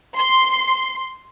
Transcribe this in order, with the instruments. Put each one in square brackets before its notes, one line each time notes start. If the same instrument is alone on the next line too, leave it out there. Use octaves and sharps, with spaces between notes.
[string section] C6